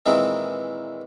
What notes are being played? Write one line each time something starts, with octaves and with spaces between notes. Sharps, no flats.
A#2 D#3 E3 G#3 C4